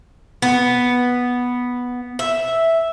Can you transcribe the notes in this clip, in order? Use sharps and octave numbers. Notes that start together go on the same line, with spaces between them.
B3
E5